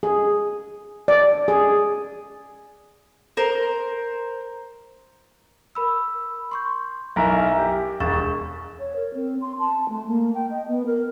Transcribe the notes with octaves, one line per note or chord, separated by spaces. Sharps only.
G#4
D5
G#4
A#4 C5
A#4 B5 E6
C6 C#6 G6
B1 E4 A#4 E5 G#5
G4
E1 C#6 A6 E7
C#5
A#4
C4
C6
A5
A3
A#3
G5
D#5
B3
A#4